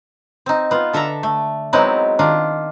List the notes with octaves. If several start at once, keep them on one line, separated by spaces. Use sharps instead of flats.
C4 D#4
B3 F4
D3 A4 E5 A5 A#5
A3
F#3 G#3 B3 C4 D#4 E4
D#3 D4 F4